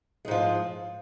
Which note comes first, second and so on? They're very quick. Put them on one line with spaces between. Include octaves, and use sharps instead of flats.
G#3 G#2 F3